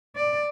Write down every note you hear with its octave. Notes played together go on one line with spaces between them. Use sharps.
D5